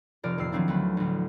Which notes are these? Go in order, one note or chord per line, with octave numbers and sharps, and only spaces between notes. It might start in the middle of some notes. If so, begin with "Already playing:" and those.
F1 F3 A#4 D5 F6
D#1 F2 A#3 E6 C7
D#3 F3 F#3 C4 D4 E4
D2 A3 B4
A1 D2